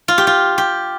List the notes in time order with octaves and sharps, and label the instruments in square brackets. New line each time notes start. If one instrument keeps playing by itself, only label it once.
[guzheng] F4
G4
F4
G4